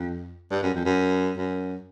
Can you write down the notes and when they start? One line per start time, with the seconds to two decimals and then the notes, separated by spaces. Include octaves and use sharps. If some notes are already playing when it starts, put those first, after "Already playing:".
Already playing: F2
0.51 G2
0.63 F#2
0.74 F2
0.86 F#2
1.37 F#2